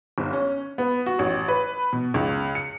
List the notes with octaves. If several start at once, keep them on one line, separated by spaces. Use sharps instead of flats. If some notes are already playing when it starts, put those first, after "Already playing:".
G1
C#4
B3
F#4
A1
B4
B2
C#2
C#7